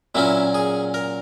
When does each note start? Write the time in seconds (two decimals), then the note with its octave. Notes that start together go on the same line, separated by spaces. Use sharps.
0.15 A#2 F#3 A#3 C#4 E4
0.54 G#4
0.94 A#4